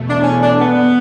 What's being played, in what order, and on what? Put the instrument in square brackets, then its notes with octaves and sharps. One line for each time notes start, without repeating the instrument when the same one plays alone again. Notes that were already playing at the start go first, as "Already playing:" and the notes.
Already playing: [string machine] E2 B2 A3
[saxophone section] D4
C#4
D4
B3